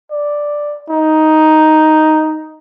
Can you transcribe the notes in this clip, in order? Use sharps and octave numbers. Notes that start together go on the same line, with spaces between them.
D5
D#4